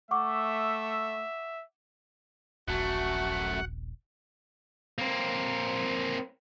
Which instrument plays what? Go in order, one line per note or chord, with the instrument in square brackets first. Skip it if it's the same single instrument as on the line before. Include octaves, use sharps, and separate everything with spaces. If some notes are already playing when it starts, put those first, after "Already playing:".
[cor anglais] A3 [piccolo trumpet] E5 [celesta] F#5 C#6 D6
[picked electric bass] D#1 A#1 [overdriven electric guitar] F#2 A3 [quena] F#4 [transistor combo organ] F#5
[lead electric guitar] A#3 C4